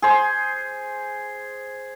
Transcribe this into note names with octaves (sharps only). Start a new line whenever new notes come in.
G#4 C5